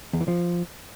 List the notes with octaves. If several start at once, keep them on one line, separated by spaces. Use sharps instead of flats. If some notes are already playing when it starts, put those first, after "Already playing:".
E2
E3
F3